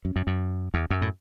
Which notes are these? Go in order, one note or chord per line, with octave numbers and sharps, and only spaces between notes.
F#2
F#2
F#2
E2
F#2
A2